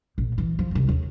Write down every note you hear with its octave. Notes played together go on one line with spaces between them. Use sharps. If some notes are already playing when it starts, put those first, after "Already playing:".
A#1
E3
F3
C2 F#2
D#2 D#3